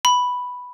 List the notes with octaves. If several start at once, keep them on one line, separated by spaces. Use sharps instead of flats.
B5